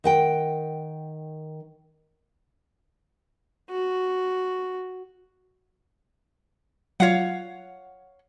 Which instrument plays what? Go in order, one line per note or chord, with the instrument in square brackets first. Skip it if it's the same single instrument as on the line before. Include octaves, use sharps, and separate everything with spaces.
[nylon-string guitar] D#3 F#5 G5
[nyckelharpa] F#4
[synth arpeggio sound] F#3 F4 [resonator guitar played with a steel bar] C#5 F5 F#5